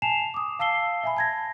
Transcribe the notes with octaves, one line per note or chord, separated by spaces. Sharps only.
G#5 A5 C7 E7 F7
D6 D#6
F5 A5 E6 C7 G7
E5 G#5 B5
A5 G#6 A#6